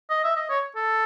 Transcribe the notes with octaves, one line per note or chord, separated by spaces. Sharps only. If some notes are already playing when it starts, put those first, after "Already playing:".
D#5
E5
D#5
C#5
A4